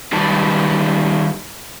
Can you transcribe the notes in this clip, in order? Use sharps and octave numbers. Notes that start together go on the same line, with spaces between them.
D#3 G3 D#4 B4 A5